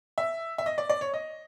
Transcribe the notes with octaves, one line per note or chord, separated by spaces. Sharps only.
E5
E5
D#5
D5
D5
C#5
D#5